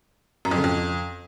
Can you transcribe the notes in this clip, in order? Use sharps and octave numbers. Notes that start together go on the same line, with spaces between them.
F#2
F2
C#3
F2